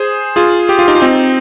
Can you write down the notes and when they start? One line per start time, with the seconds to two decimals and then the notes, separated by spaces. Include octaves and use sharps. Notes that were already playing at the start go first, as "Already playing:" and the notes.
Already playing: G#4 C5
0.36 F4 G#4
0.69 G4
0.79 F4
0.88 D#4 G4
0.95 F4
1.02 C4 D#4